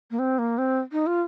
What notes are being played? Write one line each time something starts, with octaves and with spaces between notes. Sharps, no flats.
A#3
C4
A#3
C4
D#4
F4